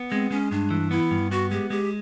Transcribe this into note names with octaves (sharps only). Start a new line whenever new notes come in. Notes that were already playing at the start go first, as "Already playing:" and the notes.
Already playing: B3
G#3 C4
G#3 C#4
G2 D4
E3
B3 E4
G2
B3 F#4
G#3 G4
G#3 G4